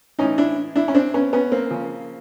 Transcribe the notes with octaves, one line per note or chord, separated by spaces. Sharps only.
A2 E3 C#4 D#4
D4 E4
D4 E4
C#4
C4 D4
B3 C#4
B3 C#4
A#3 C4
C#3 F3